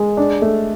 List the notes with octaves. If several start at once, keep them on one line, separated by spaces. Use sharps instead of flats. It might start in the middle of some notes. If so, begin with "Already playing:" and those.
Already playing: G#3
D4
A3